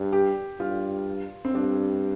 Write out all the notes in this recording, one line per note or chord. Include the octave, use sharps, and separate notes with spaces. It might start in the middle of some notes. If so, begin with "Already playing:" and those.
Already playing: G2
G4
G2 F4
C4
G2 D4